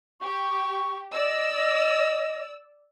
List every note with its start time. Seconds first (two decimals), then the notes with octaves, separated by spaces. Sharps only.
0.23 G4 C#6
1.12 D5 D#5 E6